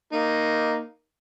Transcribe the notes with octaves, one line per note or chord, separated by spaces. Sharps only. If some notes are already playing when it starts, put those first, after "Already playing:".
A#3 D#4